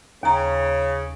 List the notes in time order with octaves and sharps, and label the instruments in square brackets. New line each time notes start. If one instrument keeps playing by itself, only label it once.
[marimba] D#2 A#5 [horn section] C#3